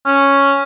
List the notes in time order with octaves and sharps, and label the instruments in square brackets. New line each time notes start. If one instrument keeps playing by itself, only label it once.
[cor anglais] C#4